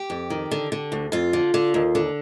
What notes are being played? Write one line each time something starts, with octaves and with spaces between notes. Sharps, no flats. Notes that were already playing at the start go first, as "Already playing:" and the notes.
Already playing: G4
F2
D#3
D3
D3
D2
F2 F4
D3
D3
D#2
D3